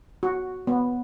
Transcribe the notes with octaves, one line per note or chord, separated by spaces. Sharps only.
F#4
B3